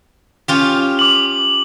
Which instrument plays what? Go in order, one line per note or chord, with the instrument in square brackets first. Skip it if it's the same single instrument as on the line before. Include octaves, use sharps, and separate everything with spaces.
[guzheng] C#4 F4 G4
[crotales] D6 F#7